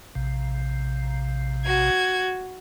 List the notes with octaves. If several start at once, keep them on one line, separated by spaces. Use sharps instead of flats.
A#1 C3
F#4 G#6